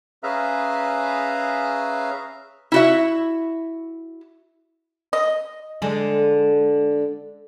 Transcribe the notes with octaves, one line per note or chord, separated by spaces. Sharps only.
C#4 G#4 B4 E5 F5 A#5
E4 F#4 E5
D#5
D3 G#3